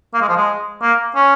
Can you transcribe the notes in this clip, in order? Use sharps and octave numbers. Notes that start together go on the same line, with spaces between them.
A#3
G#3
F3
G#3
A#3
C#4